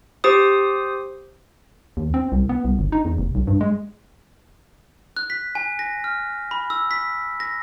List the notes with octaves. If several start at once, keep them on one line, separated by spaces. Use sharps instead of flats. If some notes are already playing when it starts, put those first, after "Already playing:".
G4 C5 D#6
D#2
C4
C2
B3
C2
G1
D#4
E2
F1
B1
G2
G#3
F#6
B6
G#5
A#6
F6
B5
E6
B6
A#6